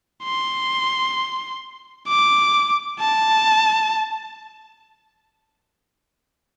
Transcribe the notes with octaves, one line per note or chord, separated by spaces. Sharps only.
C6
D6
A5